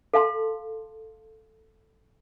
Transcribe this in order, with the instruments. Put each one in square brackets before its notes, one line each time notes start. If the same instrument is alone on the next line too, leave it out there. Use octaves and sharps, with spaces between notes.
[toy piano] A4 F5 A5 C6